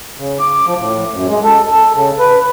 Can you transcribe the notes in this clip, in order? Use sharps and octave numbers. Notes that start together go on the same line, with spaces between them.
C#3
D6
F3
A2
F#2
G#3
A4
A4
C#3
B4